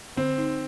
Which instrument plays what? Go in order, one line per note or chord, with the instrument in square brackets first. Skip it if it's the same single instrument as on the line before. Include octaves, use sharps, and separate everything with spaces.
[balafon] D3 [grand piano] C4
[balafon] D#4